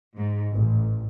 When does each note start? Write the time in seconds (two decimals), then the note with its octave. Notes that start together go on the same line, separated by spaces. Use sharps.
0.17 G#2
0.53 A1